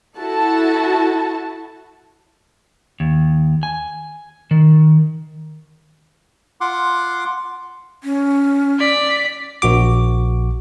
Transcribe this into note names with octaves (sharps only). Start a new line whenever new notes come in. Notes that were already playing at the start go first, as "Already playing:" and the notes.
E4 F#4 A4 A5
D#2
G#5
D#3
F4 F#5 C6 D6
C#4
D5 B6
A#1 F#4 D6